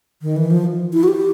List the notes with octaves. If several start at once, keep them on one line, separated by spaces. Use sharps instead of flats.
D#3
E3
F3
E4
F#4
G4